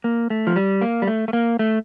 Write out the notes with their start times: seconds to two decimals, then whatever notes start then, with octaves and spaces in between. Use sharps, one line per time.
0.04 A#3
0.30 A3
0.47 F3
0.56 G3
0.81 A#3
1.02 G3
1.07 A3
1.28 A3
1.33 A#3
1.59 A3